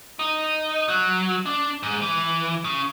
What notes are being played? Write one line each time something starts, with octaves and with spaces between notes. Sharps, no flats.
D#4
F#3
D4
G#2
E3
C#3